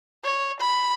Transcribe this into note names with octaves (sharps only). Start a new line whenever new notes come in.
C#5
B5